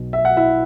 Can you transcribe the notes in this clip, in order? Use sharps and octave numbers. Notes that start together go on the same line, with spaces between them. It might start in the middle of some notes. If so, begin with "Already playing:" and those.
Already playing: B1 B2 F#3
E5
F#5
E4 E5